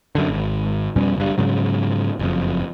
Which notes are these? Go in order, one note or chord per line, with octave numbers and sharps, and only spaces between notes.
F#2 D3
G#1
F2 B2 G3 C#4
F#1 G2
G#2 C#3 F#3
F#1 F2